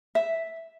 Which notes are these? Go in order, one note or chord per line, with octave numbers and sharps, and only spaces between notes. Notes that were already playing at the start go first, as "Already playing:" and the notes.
E5